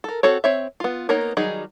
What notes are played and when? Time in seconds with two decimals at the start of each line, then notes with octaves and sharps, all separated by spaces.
0.04 A4 A#4
0.23 C4 F#4 A4 C#5
0.44 C4 C#5 E5
0.80 B3 F4
1.09 A#3 B3 D#4 A#4 C#5
1.37 D#3 F#3 G3 D#4 G#4